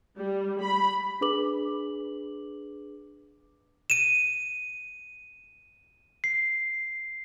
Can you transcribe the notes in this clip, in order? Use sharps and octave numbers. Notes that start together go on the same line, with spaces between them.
G3
B5
D4 G#4 B4 D6 F#7
D#7 E7
C7